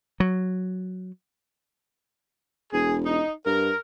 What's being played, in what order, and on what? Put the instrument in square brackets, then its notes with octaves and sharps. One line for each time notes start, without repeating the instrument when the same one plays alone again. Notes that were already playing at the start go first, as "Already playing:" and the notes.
[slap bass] F#3
[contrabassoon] E1 [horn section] G#4
[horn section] D#4
[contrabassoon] G2 [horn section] A#4